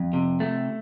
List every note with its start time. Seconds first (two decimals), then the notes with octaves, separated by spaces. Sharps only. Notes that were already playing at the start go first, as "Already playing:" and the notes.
Already playing: F2
0.13 C3
0.40 A3